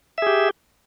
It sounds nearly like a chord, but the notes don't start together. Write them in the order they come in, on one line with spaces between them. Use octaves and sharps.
E5 G#4 G4